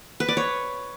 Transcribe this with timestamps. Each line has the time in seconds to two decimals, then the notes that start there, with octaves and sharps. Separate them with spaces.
0.20 B4
0.28 D5
0.37 C#5